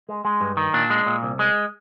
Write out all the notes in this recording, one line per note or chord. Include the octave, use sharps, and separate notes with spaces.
G#3
G#3
G2
D#3
A#2 D4
G#3
A#2
C2
G#3